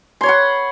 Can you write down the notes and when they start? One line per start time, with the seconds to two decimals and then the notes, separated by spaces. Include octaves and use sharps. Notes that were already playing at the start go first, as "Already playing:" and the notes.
0.21 C6
0.23 C#5
0.26 B5
0.29 F#5